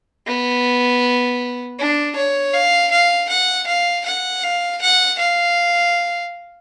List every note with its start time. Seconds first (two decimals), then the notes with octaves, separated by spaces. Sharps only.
0.27 B3
1.79 D4
2.16 C#5
2.54 F5
2.92 F5
3.29 F#5
3.67 F5
4.06 F#5
4.43 F5
4.82 F#5
5.19 F5